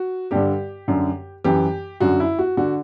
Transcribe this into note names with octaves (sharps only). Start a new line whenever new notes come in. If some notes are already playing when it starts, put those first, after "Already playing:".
Already playing: F#4
G2 D3 G4
F#2 D3
F#2 E3 G4
F#2 D3 F#4
E4
F#4
D3 F#4